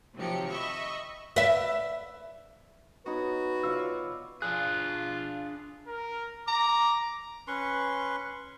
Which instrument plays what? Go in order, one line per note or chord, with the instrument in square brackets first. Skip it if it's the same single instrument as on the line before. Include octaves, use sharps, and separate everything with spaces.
[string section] C3 D#3 F3 F#3 G4 C#7
D#5 E5 B5 C#6
[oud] B4 E5
[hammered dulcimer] B3 D#4 C#5 [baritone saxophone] F#4 [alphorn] B4
[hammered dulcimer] F4 C#5 D5 [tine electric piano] E6
[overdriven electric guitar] D4 G#4 [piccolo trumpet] F4 [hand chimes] F#6
[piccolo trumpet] A#4
[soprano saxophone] A#5 [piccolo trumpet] D6
[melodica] C#4 B4 C6 C#6